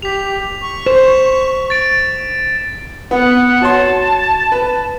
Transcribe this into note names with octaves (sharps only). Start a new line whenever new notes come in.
G4 B6 F7
C#6
C5 E7
A6 D7
B3 F#5
F#4 C#5 A5 C6
B4